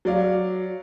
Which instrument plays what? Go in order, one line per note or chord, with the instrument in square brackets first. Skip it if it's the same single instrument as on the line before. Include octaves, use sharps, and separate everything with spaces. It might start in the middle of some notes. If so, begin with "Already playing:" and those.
[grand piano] F#3 D5 F5